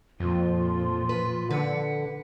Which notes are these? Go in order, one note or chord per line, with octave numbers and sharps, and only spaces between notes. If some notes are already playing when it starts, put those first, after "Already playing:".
F2 A#2 F3 F4
B4
D3 B4 F#5